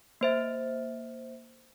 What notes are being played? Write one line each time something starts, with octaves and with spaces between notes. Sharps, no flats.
A#3 C5 E5